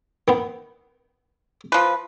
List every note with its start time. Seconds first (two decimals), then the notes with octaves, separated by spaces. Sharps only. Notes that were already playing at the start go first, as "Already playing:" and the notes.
0.28 D#3 B3
1.72 F3 B4